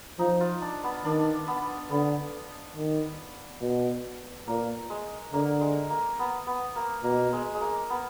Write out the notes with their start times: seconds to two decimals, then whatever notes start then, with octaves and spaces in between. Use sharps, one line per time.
0.19 F3 D#4
0.40 F4
0.62 D4
0.84 B3
1.05 D#3 D4
1.48 B3
1.91 D3 B3
2.76 D#3
3.61 B2
4.47 A#2 A#3
4.90 G#3
5.33 D3 A#3
5.61 G#3
5.90 A#3
6.19 B3
6.47 B3
6.76 A#3
7.04 B2 A#3
7.33 G#3
7.54 G#3
7.61 A#3
7.90 B3